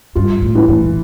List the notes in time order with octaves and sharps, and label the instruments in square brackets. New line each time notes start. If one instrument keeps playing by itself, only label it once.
[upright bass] G2 [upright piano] F4
[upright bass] A2
[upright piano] E3
[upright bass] A2
A#2